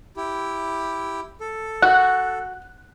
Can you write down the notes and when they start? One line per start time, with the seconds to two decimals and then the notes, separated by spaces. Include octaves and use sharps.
0.17 E4 G4
1.40 A4
1.82 F#4 F#6